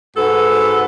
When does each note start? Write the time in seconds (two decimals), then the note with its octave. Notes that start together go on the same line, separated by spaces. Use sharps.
0.17 G#2 F#4 A4 B4